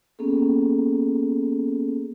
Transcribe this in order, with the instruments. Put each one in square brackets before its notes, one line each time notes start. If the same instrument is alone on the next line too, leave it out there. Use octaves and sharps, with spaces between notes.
[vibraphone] A#3 B3 C#4 G#4 A4